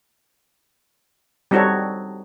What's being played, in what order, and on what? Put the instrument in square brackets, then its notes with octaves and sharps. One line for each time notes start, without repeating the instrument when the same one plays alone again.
[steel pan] G3 C4 D#4 F#4 A4 C#5